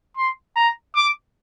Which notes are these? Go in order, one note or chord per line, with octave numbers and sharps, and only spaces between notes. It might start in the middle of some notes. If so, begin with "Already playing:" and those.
C6
A#5
D6